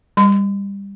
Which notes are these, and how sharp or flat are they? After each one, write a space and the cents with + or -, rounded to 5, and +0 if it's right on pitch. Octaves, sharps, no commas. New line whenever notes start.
G3 +20 C6 -40